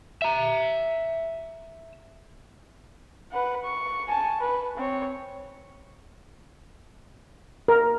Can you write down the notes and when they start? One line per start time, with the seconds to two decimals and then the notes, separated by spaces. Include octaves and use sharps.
0.22 E5 A#5
3.32 B4 F#5
3.64 C#6
4.08 G#5 A5
4.40 B4
4.77 C4 C#5
7.68 A#4